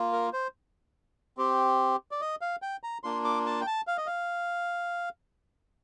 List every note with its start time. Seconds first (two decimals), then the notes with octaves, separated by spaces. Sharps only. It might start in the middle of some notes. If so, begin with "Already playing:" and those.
Already playing: A#3 F4
0.13 A#4
0.33 C5
1.37 C4 G4
2.11 D5
2.21 D#5
2.41 F5
2.62 G5
2.83 A#5
3.04 A#3 D4 F4 C6
3.24 D6
3.46 A5
3.61 G5
3.67 A5
3.87 F5
3.97 D#5
4.06 F5